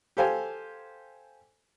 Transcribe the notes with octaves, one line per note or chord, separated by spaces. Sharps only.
G4 A4 C5 F5 G#5